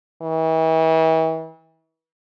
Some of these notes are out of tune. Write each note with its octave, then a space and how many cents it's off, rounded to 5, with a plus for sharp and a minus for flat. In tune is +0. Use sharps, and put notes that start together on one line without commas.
E3 -40